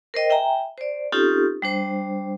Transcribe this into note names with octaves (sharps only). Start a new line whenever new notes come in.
A#4 C5 D#5 G5
E5 G5 G#5 A#5
C5 D5
C4 C#4 D#4 F4 G4 A4
G3 D4 C5